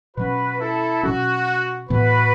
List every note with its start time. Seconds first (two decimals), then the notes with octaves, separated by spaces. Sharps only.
0.17 B2 F#3 C#4 F#4 B4
0.60 E4 A4
1.03 B2 F#3 C#4 F#4
1.90 A2 E3 B3 F#4 B4